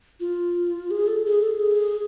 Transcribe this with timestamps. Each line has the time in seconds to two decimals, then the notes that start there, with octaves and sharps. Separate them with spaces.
0.20 F4
0.91 G#4
1.07 A4
1.25 G#4
1.43 A4
1.60 G#4